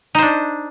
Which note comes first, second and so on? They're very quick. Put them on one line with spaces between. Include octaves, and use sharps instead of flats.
D#4 C5 D4